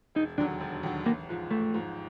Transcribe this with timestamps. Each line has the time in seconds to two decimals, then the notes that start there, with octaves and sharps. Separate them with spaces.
0.15 E1 D#4
0.38 D#2 D3 F#3 D4
0.60 E1
0.83 D#2 D3 F#3
1.06 A1 A#3
1.29 G#2 F3
1.51 A1 A3
1.74 G#2 F3